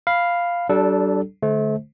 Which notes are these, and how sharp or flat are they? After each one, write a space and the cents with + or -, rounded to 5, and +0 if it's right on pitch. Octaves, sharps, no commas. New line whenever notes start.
F5 +0 B5 +0
G3 -40 D4 +0 A4 -10
D3 +0 A3 -35 C5 +0